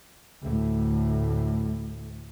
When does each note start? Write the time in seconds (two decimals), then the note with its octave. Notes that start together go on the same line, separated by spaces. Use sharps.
0.42 D2 A2